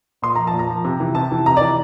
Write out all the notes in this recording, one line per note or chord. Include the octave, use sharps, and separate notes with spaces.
A#2 C6
F3 A#5
A5
A#2
A#5
F3
C3
E3
C3 A5
E3
C3 A#5
D5
E3